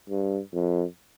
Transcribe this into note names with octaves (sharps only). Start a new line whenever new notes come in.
G2
F2